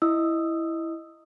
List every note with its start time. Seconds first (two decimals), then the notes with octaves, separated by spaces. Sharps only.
0.02 E4 D#5 D#6 E6